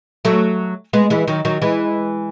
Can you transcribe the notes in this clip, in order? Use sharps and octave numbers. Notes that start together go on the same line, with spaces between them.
F#3 A3
G#3 B3
E3 G#3
D#3 F#3
D#3 F#3
E3 G#3